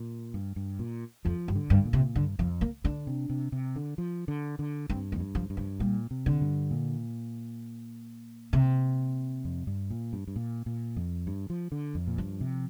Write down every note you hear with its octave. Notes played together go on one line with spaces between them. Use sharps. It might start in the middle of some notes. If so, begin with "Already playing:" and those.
Already playing: A#2
G2
G2
A#2
F2 F3
G2
D3
G2
A#2
C3
G2 D3
F2 F3
A#3
D3 D4
C3
C3
C3
D3
F3
D3
D3
G2 C4
A#3
F2
G2
F3
G2
F3
A#2 G3
C3
D3
G2
A#2
C3
F2
G2
A#2
G2
G2
A#2
A#2
F2
G2
F3
D3
F2
A#2
G2 F3
C3